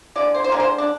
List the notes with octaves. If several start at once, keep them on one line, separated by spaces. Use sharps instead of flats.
D3 G#3 D5
C5
C5
D3 G#3 A#4
C5
D4